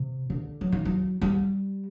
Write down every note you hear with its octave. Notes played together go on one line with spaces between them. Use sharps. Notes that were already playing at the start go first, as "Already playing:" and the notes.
Already playing: C3
D3
F#3
D#3
F#3
G3